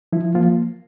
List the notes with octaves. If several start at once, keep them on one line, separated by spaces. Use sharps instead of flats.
F3 E4
F3 A#3 F4